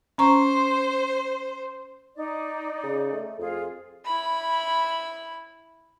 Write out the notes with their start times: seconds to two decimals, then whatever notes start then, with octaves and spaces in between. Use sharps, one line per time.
0.18 C#4 C5 A#5 C#6
2.15 D#4 D5
2.83 C#3
3.13 A3
3.39 F2 F4 G#4
4.05 E4 B5